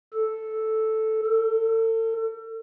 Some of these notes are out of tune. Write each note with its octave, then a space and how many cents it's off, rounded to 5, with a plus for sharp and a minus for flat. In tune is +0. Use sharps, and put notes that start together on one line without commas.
A4 -5
A4 +35